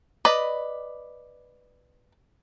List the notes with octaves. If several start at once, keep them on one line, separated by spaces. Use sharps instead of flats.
B4 D5 D#5